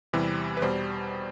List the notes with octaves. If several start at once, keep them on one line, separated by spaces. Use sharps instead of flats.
E2 C3 E3 G3 C4
B4
E2 B2 G3 C5